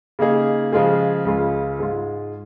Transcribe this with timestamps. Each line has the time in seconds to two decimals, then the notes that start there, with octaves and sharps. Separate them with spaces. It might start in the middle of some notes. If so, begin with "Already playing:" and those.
0.19 C#3 A#3 D#4 G#4
0.72 C#3 F3 G#3 F4 G#4
1.25 C#2 C#3 G#3 F4
1.79 G#2 G#3 F4